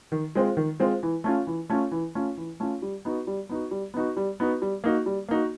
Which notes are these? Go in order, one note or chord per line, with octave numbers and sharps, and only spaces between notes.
D#3
G#3 C4 F4
D#3
G#3 C4 F4
E3
A3 C#4 F4
E3
A3 C#4 F4
E3
A3 C#4 F4
E3
A3 C#4 F4
G3
B3 D#4 F#4
G3
B3 D#4 F#4
G3
B3 D#4 F#4
G3
B3 D#4 F#4
G3
A#3 D#4 F#4
G3
A#3 D#4 F#4